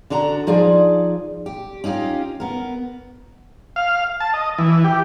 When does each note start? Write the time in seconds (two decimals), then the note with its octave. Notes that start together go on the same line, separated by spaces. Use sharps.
0.10 D3 D4 F#4 A#5
0.47 F3 D#4 F4 G#4 D5
1.46 G4
1.84 C#4 D#4 F4 G4
2.40 B3 A#4
3.76 F5
4.20 A5
4.34 D#5
4.58 E3
4.84 G4